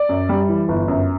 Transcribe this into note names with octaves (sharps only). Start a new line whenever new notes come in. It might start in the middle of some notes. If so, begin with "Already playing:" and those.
Already playing: D5
F#2
G3
E3
G1
F#2